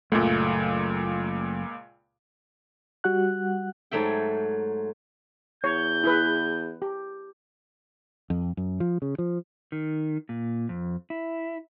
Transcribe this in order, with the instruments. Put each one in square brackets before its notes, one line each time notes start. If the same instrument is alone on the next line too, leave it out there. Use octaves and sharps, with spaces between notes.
[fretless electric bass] F#1 A3 [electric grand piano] C#2 A#2
[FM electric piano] G3 F#4 F#5 F#6
[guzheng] G#2 F#3 A3 E5 G5
[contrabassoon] E2 [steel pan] C#5 [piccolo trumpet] G6
[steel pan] E4 G#4 B4
G4
[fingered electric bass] F2
F#2
F3
C#3
F3
[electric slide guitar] D#3
A#2
F2
E4